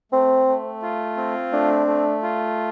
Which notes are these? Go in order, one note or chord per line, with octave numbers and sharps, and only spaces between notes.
A3 C4
A3
F4
C4
A3 D4
A3
F4